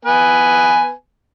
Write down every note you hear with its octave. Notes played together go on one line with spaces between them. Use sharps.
B3 B4 G#5